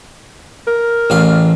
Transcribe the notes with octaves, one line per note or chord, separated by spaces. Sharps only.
A#4
A1 F5